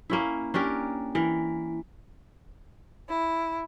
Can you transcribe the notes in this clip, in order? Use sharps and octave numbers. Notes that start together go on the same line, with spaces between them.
A#3 C#4 E4
C#4 D4 G4 A#4
E3 A#4
E4